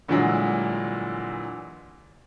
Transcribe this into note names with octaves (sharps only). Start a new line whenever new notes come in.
G2 A#2 D3 E3 F#3 G#3